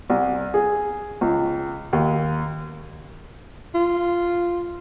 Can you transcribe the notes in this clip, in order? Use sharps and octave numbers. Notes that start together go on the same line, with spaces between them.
C2
G#4
C#2
D#2
F4